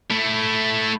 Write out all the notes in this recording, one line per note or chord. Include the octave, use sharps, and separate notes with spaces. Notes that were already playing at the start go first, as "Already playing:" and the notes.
A3 E4